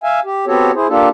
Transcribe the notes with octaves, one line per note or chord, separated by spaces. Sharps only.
E5 F5 G#5
G4
B3 C4 F#4 G4 A4 C#5
E4 G#4 C5
A#3 D4 F4 G4 A4